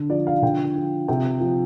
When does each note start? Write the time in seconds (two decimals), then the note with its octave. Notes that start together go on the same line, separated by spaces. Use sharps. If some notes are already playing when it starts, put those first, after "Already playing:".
Already playing: D3
0.10 F3 D5
0.27 F5
0.42 D3 G5
0.76 F3
1.08 C3 G5
1.40 F3